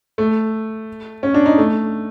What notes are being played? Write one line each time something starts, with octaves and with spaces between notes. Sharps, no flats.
A3
C#4
D4
D#4
A3